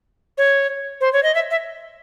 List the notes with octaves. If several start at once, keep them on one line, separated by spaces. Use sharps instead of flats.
C#5
C5
C#5
D#5
E5
E5